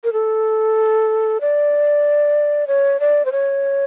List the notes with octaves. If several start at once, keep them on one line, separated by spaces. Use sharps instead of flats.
A#4
A4
D5
C#5
D5
C5
C#5